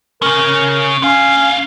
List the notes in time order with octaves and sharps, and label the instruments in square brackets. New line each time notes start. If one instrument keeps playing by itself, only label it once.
[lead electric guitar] C#3 C#4 [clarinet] A#4
[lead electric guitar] D3 F5 [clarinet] C#4